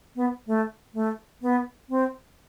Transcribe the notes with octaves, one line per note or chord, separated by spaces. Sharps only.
B3
A3
A3
B3
C4